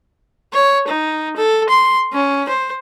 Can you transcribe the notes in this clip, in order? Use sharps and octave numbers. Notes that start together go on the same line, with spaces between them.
C#5
D#4
A4
C6
C#4
C5